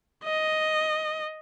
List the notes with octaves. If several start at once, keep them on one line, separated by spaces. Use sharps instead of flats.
D#5